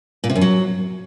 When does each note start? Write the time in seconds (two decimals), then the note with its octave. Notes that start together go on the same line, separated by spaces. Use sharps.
0.24 A#2
0.30 C3
0.36 F#2
0.41 F#3